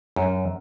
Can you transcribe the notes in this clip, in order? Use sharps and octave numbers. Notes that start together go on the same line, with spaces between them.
F#2